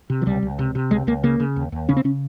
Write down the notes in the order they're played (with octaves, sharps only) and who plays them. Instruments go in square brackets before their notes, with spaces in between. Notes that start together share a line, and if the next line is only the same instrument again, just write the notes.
[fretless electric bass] C3
F3
C#2 G3
C#2
C3
C3
C#2 G#3
C#2 A#3
C#3 A#3
C#3
D#2
D#2
C#3 C#4
C4
C#3 C#4